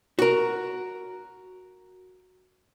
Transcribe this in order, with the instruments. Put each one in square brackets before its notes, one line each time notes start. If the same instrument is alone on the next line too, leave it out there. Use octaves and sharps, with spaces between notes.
[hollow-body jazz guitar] F#4 A#4